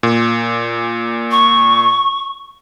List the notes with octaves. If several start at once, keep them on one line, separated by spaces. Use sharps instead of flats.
A#2
C#6